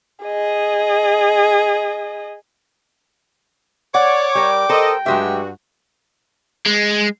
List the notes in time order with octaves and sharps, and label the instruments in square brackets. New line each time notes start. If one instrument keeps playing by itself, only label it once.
[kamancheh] G#4 D#5
[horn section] C#5 [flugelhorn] D5 [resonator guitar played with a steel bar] F#5 [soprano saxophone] D6
[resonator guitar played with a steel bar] G3 A#4 [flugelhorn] G5
[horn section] A4 D#5 [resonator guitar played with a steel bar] A#4 C5
[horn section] G2 F#4 [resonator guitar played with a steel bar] F#3 G#3 E5 [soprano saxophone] G4
[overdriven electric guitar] G#3